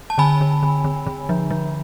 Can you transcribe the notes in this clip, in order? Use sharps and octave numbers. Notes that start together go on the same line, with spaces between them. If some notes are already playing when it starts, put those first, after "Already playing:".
A5
D3 G#5 B5
D3
D3
D3
D3
F3
F3